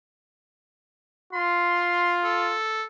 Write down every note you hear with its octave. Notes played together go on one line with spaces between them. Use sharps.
F4 C6
A4